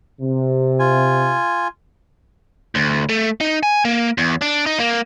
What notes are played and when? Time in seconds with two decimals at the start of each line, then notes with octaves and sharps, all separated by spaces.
0.21 C3
0.79 F4 G#5
2.75 D2
3.09 A3
3.41 D#4
3.63 G#5
3.85 A#3
4.18 E2
4.41 D4
4.66 D#4
4.79 A#3